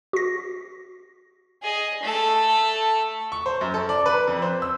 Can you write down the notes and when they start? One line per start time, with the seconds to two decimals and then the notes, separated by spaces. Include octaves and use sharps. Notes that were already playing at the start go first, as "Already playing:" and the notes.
0.13 F#4 A#6
1.63 G#4 D#5
2.03 A3 A4
3.32 C#6
3.46 C5
3.61 F#2
3.74 A4
3.89 D5
4.06 B4
4.27 F2
4.42 C5
4.62 E6